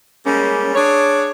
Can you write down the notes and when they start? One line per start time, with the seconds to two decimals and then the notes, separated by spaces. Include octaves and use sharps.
0.25 G3 G#3 A#3 C#4
0.75 D4 G#4 C#5